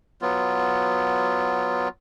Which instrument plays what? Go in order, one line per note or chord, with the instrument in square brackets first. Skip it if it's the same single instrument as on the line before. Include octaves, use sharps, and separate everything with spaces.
[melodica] F#3 B3 F4